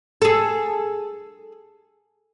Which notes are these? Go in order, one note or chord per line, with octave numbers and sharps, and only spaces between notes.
G#4 A4